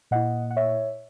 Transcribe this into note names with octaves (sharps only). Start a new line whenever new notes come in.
A#2 A#3 E4 D#5 F#5
F#5
C#5 E5